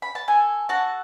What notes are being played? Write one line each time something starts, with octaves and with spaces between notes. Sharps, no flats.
B5
A5
A4 G#5
F#4 A5